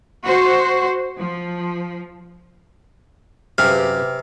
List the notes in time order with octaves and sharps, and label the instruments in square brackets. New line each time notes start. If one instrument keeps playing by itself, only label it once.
[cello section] F#4 C5
F3
[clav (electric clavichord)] F#2 G#4 F5 [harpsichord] C3 [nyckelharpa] G4 B4 [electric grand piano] F6